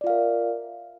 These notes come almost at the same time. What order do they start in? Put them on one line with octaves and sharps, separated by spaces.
D5 F4 F5 A#4 E5